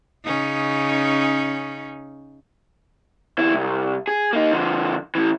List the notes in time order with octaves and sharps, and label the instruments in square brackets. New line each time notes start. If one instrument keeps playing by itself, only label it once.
[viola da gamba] C#3 C#4 D#4
[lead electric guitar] D#2 E4
C2
G#4
A#3 D#4
D3 F3
A2 E3